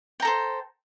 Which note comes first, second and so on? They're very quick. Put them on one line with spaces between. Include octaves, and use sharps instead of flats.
G5 A#5 A4 C5